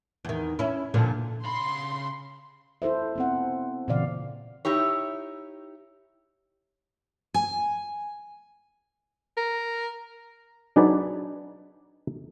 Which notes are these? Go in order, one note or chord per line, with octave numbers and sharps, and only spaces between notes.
E2 D#3
C#4 E4
A#2 D3 F3
C#3 B5 C6
E4 A4 C5 E5
B3 C4 F#5
A#2 C#3 E3 D5 F5
D#4 E4 G4 C#5
G#5
A#4
F#3 D4 D#4 G#4 B4 D5